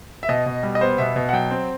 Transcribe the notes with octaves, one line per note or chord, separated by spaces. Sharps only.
E5
B2 D#5
B2
G3
D#5
B3 C5
B2 E5
B2
F#5
F#3 G5
C4